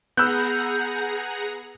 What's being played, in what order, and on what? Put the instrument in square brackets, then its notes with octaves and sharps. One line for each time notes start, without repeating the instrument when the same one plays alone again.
[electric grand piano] B3 B5 [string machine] G#4 F#5 A#5 [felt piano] E6 F#6 [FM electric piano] G6